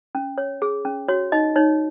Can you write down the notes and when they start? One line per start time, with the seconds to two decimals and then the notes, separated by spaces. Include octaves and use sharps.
0.15 C#4
0.38 C#5
0.62 G#4
0.85 C#4
1.08 F#4 C#5
1.32 D#4 D#5
1.56 D#4 C#5